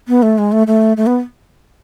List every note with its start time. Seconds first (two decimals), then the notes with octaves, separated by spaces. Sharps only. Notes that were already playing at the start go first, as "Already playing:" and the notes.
0.08 B3
0.22 A3
0.38 G#3
0.52 A3
0.67 A3
0.97 A3
1.07 B3